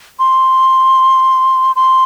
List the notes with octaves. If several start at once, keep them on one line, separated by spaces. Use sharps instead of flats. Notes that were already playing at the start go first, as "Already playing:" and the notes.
C6
C6